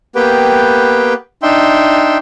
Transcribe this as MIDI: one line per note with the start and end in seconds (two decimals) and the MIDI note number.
0.15 1.14 58
0.15 1.14 59
0.15 1.14 67
0.15 1.14 71
0.15 1.14 79
1.42 2.17 62
1.42 2.17 63
1.42 2.17 76
1.42 2.17 79
1.42 2.17 84